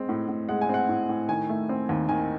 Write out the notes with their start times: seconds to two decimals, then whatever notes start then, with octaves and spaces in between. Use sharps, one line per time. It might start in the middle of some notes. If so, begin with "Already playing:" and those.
Already playing: G#3 C4
0.09 A2
0.28 A2
0.49 G#3 F#5
0.61 G#5
0.69 C4 F#5
0.89 A2
1.09 A2
1.29 D#3 G#5
1.49 A3
1.69 C4
1.89 D#2
2.09 D#3 G#5